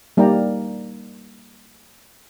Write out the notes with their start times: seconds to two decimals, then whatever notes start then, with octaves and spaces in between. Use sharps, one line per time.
0.17 G3 A#3 D#4 D5 G5 A#5